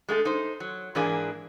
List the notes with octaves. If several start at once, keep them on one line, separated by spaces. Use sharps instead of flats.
G#3 A3 F4 A4
D#4 C5
F#3
G#2 E3 A#3 D4 E4 G#4